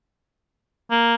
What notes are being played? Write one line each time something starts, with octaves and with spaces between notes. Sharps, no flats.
A#3